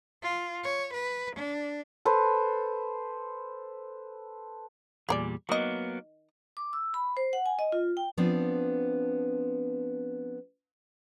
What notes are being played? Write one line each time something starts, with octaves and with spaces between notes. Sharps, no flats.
F4
C#5
B4
D4
A4 B4 C5
E2 A#2 G3 G#4 A#4 D5
D#3 F#3 A#3 B3 D#5
D6
E6
B5
C5
F#5
G#5
D#5
F4
G5
F3 B3 C4 D4